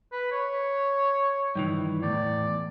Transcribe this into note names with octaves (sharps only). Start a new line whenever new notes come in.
B4
C#5
G2 D#3 E3
E2 A2 D5